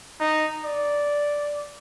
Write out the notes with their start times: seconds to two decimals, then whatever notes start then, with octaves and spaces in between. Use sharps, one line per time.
0.20 D#4
0.64 D5